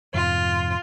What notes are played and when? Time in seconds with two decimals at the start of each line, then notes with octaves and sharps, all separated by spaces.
0.14 F2 G#2 C3 F4